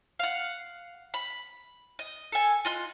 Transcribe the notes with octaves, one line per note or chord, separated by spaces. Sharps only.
F5 F#5
B5
D#5
A4 G#5
F4 D#5 F#6